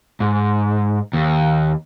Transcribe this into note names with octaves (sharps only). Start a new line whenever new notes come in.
G#2
D#2